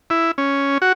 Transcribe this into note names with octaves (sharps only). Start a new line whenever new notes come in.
E4
C#4
F#4